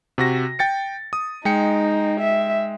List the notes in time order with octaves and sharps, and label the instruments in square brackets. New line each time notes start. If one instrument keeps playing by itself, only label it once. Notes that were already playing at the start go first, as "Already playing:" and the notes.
[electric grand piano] C3 F#4 A#6
G5 A6 C#7
D#6
[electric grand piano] G#3 G5 C#7 [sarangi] D#4
[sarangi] E5